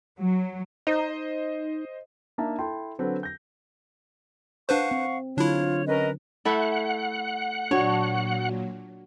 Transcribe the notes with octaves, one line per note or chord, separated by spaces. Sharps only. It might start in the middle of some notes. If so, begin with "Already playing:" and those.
F#3
D#4 C5 D#5
A#3 D4 D#4 E5 A5 A#5
E4 A4 E5 G5 A5 C6
D3 F#3 C4 A4 B4
G6 A#6
D4 B4 C5 F5 F#5 C#6
C4
D3 F#3 D4 E4 F4 C#5
C#4 A#4 B4 D#5
A3 E4 A4 F#5
A#2 F#3 D4 F#4 C#5